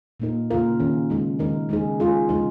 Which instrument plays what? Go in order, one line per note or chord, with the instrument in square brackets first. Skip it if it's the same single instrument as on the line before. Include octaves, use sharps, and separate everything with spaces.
[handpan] A#2 A#3 D#4 A#4
C#3 A#3 F4 A#4
D#3 C#4 G#4
C#3 G#3 D#4 A#4
D#3 G#3 D#4 A#4
C#3 G#3 D#4 G#4
G#3 F4 G#4
C#3 F3 G#3 D#4